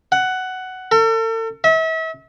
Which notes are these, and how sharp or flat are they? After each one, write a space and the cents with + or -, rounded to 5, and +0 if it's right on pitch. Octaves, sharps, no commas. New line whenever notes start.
F#5 +10
A4 +40
E5 -35